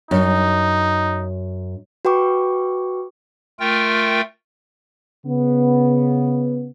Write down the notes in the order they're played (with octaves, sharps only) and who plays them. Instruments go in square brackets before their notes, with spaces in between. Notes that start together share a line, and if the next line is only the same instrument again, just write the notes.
[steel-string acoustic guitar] F#2 [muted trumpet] D#4
[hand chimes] F#4 B4 G5 C#6 D6
[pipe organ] A3 F4 A#4 G5
[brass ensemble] C#3 B3